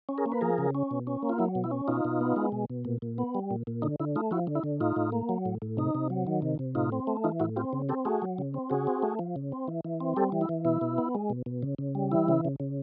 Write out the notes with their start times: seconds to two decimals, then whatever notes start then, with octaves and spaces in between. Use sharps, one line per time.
0.09 C#4
0.18 G#4 A#4
0.26 A#3
0.32 B4
0.41 F3 G#4 A#4
0.58 C#3
0.75 C#4
0.91 B2
1.07 C#4
1.22 A#3
1.29 F4
1.38 F#3 E4
1.55 B2
1.64 E4
1.71 C#4
1.88 B2 D#4 F4
2.05 B2
2.21 B3
2.36 G#3
2.52 B2
2.70 B2
2.85 A#2
3.02 A#2
3.18 B3
3.35 G3
3.51 A#2
3.67 A#2
3.82 D3 D#4
4.00 D3 E4
4.16 A3 D#4 F4
4.31 F3 E4 F#4
4.47 D3
4.55 E4
4.64 D3
4.80 A2 D#4 F4
4.96 A2
5.12 A#3
5.29 F#3
5.45 A2
5.62 A2
5.77 C3 D#4
5.95 C3
6.10 F#3
6.27 D#3
6.42 C3
6.59 C3
6.75 A2 D#4 F4
6.92 C4
7.07 A3
7.24 E3 D#4 F4
7.40 A2 E4 F#4
7.56 C4 F4 G4
7.73 C#3
7.89 C4 G4 A4
8.05 A3 F#4 G#4
8.22 F#3
8.38 C#3
8.54 C4
8.70 C#3 F#4 G#4
8.87 C4
9.03 A3
9.19 F3
9.36 C#3
9.52 C4
9.68 E3
9.85 E3
10.00 C4
10.16 G3 G4 A4
10.32 E3
10.41 E4
10.49 E3
10.65 B2 E4
10.81 B2
10.98 B3
11.15 G#3
11.30 B2
11.46 B2
11.63 C#3
11.78 C#3
11.95 G3
12.11 E3 E4
12.28 C#3
12.45 C#3
12.60 C#3